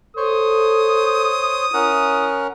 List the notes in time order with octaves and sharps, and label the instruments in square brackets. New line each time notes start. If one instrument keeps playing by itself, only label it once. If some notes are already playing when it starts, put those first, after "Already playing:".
[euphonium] A4 [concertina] C5 C#5 [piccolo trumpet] D#6
[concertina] C#4 A#4 F#5 [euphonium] E4